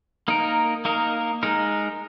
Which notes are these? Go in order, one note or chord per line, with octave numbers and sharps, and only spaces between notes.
A#3 D#4 A#4
A#3 D#4 A#4
G#3 D#4 A#4